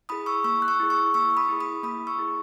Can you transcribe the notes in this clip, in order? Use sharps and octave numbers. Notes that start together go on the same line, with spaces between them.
E4 G#4 B5 D#6
C#6 E6
A#3 C#6 E6
F#6
C#6 E6
E4 G#4
C#6 E6
A#3 C#6 E6
B5 D#6
E4 G#4
B5 D#6
A#3 B5 D#6
C#6 E6
E4 G#4